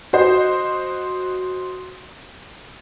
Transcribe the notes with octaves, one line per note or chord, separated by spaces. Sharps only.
F#4 C5 D#5